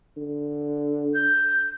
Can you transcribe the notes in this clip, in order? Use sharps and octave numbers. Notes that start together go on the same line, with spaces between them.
D3
G6